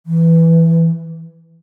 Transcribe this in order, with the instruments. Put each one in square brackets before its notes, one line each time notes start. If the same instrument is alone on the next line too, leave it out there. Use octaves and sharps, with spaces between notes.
[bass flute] E3